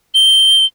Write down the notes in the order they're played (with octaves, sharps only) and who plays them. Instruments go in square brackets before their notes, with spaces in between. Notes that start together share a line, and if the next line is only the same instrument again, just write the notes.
[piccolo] G7